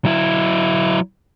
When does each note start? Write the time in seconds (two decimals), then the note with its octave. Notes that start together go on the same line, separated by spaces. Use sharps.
0.05 F#3 E4